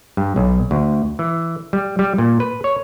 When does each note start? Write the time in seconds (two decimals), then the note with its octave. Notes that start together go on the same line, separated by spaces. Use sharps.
0.17 G2
0.36 B1
0.71 D2
1.19 E3
1.73 G3
1.99 G3
2.18 A#2
2.40 B4
2.64 C#5